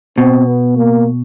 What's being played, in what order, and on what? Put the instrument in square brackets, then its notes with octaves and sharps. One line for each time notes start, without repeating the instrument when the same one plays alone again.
[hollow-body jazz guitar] B2 [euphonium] C4
[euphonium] B3
A#3